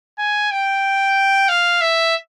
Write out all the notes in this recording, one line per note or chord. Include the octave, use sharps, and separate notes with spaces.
G#5
G5
F5
E5